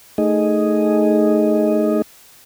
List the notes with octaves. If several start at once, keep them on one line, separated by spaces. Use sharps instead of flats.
A3 D#4 G#4 D#5